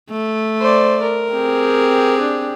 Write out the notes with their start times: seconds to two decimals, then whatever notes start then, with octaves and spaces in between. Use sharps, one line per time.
0.10 A3
0.61 C5 D5
1.02 A#4
1.33 C4 G4 G#4
2.20 D4